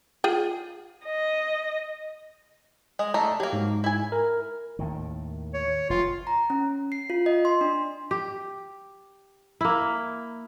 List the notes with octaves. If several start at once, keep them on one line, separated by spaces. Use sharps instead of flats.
F4 G#4 G5
D#5
G#3 D#5
A3 D4 D#5 A5 A#5
F#3 A#3 G4
G#2
E4 G#5
A#4
D#2 A2 D#3
C#5
F1 F4
A#5
C#4
C7
F4
D#5
C6
D4
G4
A#3 E4